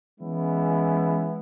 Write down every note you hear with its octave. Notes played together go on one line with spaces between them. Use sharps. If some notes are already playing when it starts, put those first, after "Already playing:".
E3 G#3 B3 C#4 E4